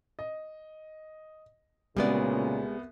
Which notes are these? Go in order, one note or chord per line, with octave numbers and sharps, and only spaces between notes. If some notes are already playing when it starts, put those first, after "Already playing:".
D#5
C2 A#2 C#3 G3 G#3 B3 F#4 D5